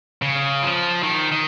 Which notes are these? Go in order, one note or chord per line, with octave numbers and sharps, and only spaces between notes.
C#3
F3
D#3
D#3